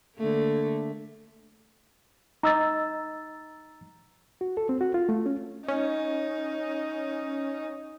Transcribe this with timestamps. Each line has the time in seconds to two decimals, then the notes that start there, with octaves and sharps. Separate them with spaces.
0.17 D3 A3 A#3
2.43 D#4 A#5 E6 A6
4.41 F#4
4.57 A4
4.69 C4
4.81 F#4
4.94 F4
5.09 A3
5.26 C#4
5.68 C#4 D#4